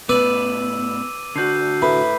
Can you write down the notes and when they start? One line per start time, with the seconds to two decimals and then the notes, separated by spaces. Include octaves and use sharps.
0.09 A2 B3 B4 D5 D6 E6 D#7
1.36 D3 F#4 G6 C7
1.82 A2 B4